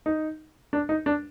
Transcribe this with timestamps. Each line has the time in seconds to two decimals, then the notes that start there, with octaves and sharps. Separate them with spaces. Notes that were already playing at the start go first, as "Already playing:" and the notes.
0.06 D#4
0.73 D4
0.89 D#4
1.06 D4